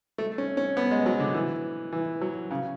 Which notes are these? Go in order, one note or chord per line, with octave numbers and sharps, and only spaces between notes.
A3
C#4
C#4
B3
G#3
F#3
D3
E3
E3
F#3
C#3